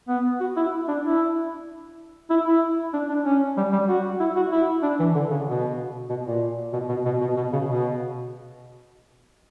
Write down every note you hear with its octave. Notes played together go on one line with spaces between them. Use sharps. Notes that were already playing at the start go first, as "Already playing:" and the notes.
B3
F#4
E4
D4
E4
E4
E4
D4
D4
C#4
G3
G3
F#4
E4
F#4
E4
D4
E3
D3
C#3
B2
B2
A#2
B2
B2
B2
B2
B2
C#3
B2